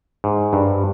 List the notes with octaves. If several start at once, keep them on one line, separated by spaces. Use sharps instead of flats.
G#2
G2